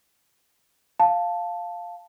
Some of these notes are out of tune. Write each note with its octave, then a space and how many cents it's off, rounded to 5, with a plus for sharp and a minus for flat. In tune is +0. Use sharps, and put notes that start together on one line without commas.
F5 +0 A5 +0